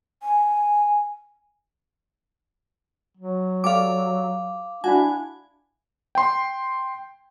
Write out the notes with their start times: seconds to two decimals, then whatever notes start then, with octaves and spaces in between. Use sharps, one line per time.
0.23 G#5
3.17 F#3
3.64 G4 A4 D5 F5 D6
4.84 D4 E4 F#4 G#5
6.15 G5 C6